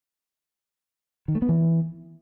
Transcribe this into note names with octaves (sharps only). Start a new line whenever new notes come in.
D#3
A3
B3
E3